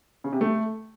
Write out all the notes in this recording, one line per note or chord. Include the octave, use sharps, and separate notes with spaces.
C#3
C3
A3